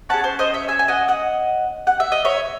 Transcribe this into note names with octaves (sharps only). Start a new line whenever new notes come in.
C#4 G#4 F#5 A5
C5
C5 D#5
C#5 E5
E5 G#5
G#5
D#5 F#5
D#5 F#5
F#5
E5
D#5
C#5 E5